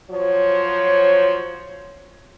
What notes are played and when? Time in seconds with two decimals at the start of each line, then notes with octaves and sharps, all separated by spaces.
0.11 F3 F#3 F#4 C5 C#5